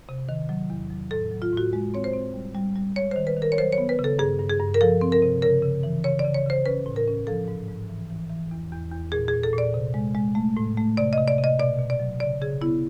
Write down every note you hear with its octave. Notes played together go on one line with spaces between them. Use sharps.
C3
D#3
F#3
E2
F#3
A2 A4
F#3
F4
A2 F#4
G#3
C4 C#5
C5
C4
G3
G3
G3
G#3 C#5
D#3 C5
B4
D#3
A#4
C#5
F#3 C5
C#5
B3
B4
C#3
A4
G2 G#4
G2
G#4
G2
A#4
F3 A4
C4
A#4
C3
C#3 A#4
C#3
E3
C#3 C#5
D5
C#3
C#5
C#3 C5
C#4 B4
A2
A#4
C#4
F3 A4
G#2
G#2
E3
E3
E3
E2
E2
E2
A#2 G#4
G#4
A#2
A4
A#2
D5
C3
G#3
G#3
A3
A2
A3
C3 D5
C3 D#5
D5
C3
D#5
B2 D5
B2
D5
F#3
C#3 D5
C#3 G#4
B3 E4